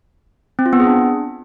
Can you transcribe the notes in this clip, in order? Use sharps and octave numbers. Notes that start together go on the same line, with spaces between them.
C4
F4
B3
G#4
D4